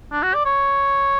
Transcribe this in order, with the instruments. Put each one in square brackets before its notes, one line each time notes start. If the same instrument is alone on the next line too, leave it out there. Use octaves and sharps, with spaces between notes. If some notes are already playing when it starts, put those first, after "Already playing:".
[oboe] D4
F#4
D5
C#5